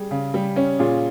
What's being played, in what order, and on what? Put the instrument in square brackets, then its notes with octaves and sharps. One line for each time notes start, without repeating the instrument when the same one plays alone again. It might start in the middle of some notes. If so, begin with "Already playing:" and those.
Already playing: [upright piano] G3 [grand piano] G#4
[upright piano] C#3
G3
C#4
[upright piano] A#2 [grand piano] F4 G#4